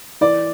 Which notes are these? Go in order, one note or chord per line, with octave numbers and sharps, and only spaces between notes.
E3 D5